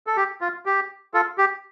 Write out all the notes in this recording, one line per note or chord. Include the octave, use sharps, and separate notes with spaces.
A4
G4
F4
G4
F4 A4
G4